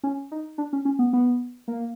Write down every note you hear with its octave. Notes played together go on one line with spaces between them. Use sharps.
C#4
D#4
D4
C#4
C#4
B3
B3
A#3